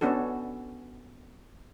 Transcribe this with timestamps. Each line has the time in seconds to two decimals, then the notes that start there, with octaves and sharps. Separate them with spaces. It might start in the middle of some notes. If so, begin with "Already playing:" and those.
0.01 B3 C#4 D4 F#4 A4